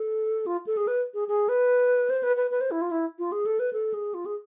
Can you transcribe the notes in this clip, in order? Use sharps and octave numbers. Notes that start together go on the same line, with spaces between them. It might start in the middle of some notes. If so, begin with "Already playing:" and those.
Already playing: A4
F4
A4
G#4
B4
G#4
G#4
B4
C5
B4
B4
B4
C5
E4
F4
E4
F4
G#4
A4
B4
A4
G#4
F4
G#4